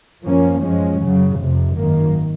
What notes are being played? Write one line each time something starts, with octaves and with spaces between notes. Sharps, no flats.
F#2 F3 A#3 C#4
F#2 F3 G#3 C#4
F#2 C#3 F#3
F1 F2 C3
G#1 F#2 D#3 A#3